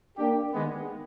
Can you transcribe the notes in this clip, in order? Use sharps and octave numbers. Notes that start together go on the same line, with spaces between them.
A#3 D4 G4
D#3 G#3 B3